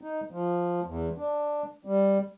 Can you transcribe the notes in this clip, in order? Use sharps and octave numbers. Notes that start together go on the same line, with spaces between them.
D#4
F3
E2
D4
G3